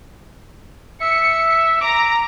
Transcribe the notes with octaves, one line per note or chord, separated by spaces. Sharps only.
E5 C#7
A#5 D6